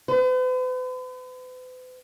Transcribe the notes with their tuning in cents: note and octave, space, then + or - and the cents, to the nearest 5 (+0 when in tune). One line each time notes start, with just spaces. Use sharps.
B4 +45